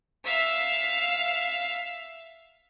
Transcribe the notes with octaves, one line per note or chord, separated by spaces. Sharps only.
E5 F5